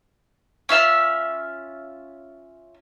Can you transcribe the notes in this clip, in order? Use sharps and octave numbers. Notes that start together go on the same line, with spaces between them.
C#4 F4 E5 E6